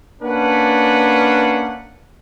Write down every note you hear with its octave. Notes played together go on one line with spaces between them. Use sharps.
A#3 C#4 D4 B4 F#5